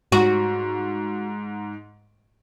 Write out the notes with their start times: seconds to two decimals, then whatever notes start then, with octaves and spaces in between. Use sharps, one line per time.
0.12 G#2 F#4